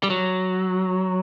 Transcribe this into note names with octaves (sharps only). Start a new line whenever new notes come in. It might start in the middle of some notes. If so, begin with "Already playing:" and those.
G3
F#3